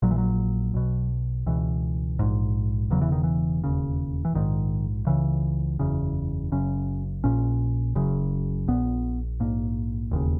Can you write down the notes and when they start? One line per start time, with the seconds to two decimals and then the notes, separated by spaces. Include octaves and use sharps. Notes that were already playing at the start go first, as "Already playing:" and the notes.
0.02 A#1 A#2 F#3
0.11 E3
0.18 F#3
0.74 B1 B2
1.46 C#2 B2 E3
2.19 A#1 G#2
2.90 E1 E2 C#3 F#3
3.01 E3
3.12 D#3
3.24 E3
3.64 E1 D#2 C#3
4.25 E3
4.35 A#1 G#2 D#3
5.07 C#2 C#3 E3
5.79 F#1 E2 C#3
6.52 F#1 F#2 C#3 C#4
7.24 A#1 A#2 C#4
7.95 F#1 F#2 C#3
8.68 A#1 A#2 B3
9.40 A#1 G#2 A#3
10.11 E1 D#2 C#3